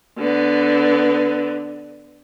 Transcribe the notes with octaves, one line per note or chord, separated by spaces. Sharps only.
D3 B3